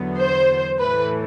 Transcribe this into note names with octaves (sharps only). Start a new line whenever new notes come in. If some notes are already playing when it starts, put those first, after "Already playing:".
Already playing: E2 D3 F#3 B3
C5
A2 E3 A3 B4